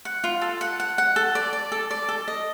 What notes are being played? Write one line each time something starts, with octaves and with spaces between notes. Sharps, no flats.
F#5
F4
A4
F#5
F#5
F#5
A4
D5
D5
A4
D5
A4
D#5